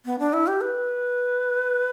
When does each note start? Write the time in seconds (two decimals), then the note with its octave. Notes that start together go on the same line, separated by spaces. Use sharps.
0.05 B3
0.19 D4
0.33 E4
0.47 G4
0.61 B4